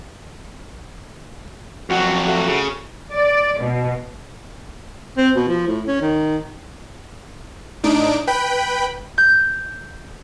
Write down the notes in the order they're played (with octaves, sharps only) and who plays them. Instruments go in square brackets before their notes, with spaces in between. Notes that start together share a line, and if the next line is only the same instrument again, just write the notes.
[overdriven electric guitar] F2 F#3 [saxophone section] F#4
[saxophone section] A3 F#4
[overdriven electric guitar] C#3
[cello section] D5
B2
[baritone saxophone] C4
B2
F3
A2
C#4
D#3
[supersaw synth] A2 D4 D#4 D7
B4 G5 B5
[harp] G6